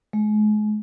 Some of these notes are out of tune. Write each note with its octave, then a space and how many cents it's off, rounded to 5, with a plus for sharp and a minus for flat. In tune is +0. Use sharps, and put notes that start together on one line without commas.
G#3 +35